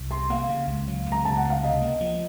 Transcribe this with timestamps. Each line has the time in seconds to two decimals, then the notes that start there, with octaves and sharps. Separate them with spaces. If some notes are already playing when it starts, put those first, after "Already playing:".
Already playing: C2
0.11 C3 C6
0.30 A#3 F5
0.49 C#3
0.67 C#2
0.88 F#3
1.06 C#2
1.12 A#5
1.25 C#3 A5
1.37 F#5
1.44 C#2
1.50 F5
1.63 C3 D#5
1.82 A#3
2.01 F3